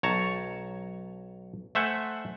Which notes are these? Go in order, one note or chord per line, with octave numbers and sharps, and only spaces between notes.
B1 C#5 A5 A#5
A3 C5 E5 F#5 G#5